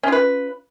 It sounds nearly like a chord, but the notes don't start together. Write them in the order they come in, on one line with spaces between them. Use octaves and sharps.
C#4 F4 B4